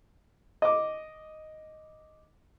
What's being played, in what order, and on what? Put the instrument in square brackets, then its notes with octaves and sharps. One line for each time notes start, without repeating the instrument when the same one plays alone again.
[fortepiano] D#5 D6